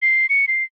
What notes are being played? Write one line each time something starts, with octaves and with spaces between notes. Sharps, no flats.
C7
C#7
C7